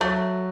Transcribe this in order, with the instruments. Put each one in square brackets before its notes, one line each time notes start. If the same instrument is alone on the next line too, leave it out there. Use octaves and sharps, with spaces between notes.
[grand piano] F#3 [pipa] A3